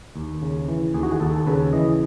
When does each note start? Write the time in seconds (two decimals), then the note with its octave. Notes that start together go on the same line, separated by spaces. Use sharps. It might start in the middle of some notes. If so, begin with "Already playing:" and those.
0.16 D#2
0.42 C#3
0.68 E3
0.94 D#2 G#4
1.03 F#4
1.11 G#4
1.20 D#2 A4
1.36 A4
1.47 C#3 B4
1.73 E3 D#5